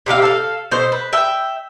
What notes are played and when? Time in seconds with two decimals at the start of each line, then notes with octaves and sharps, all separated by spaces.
0.06 C3 G4 A#4 F5
0.22 A4 F5
0.71 B2 A4 C5
0.92 B4
1.13 E5 G5